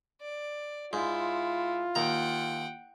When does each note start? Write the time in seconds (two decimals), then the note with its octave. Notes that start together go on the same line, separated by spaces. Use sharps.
0.21 D5
0.93 G#2 E4 F4
1.95 D#2 F#5 G5 A#5